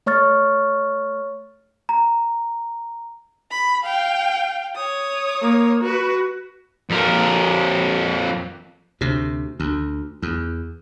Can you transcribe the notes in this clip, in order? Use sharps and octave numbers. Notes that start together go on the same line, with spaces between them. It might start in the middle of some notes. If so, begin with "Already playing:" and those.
A3 C#5 C#6 F6 A6
A#5
B5
F5 G5
C#5 D#6
A#3
F#4 B4
F2 A#4
D2 C3
D2
E2